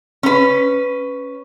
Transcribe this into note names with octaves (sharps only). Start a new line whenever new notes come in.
C#4 B4